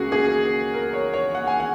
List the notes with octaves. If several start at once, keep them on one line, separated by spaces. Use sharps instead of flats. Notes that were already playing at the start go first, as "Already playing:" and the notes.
Already playing: C#2 C#3 A#3 C#4 F#4 G#4
G#4
A#4
C#5
C#5
F#5
G#5
F#5